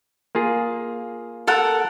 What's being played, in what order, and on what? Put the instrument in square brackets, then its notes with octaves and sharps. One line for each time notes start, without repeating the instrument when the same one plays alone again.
[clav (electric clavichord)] A#3 F4 G#4
[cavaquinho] A4 A#4 F#5